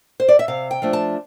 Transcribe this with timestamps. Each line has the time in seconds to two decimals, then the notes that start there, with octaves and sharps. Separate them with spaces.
0.20 C5
0.28 D5
0.39 E5
0.48 C3 F5
0.71 G5
0.82 F3 A3 D4 F4
0.93 A5